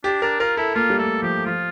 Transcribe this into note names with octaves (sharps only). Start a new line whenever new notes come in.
D4 G4
D4 A#4
F4 A#4
E4 A4
A#3 F4
G3
A3 A4
F3 G4
F3 F4